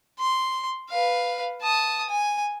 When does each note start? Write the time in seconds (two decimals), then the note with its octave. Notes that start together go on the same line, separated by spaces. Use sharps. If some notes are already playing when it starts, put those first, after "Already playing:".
0.19 C6
0.90 B4 F5
1.62 A5 D#6
2.10 G#5